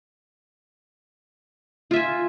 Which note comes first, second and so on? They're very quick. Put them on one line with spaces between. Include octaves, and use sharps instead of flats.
F4 E5 G#5